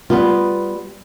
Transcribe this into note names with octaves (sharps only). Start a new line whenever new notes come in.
G3 B3 F4